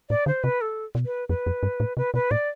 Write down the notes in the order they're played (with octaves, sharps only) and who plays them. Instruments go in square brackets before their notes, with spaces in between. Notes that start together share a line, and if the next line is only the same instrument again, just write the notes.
[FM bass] A2 [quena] D5
[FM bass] D3 [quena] C5
[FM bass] C3 [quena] B4
[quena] A4
[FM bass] B2
[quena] B4
[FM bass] F2 [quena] B4
[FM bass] F2
G2
A2
[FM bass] C3 [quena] B4
[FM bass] B2 [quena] B4
[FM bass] A2 [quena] D5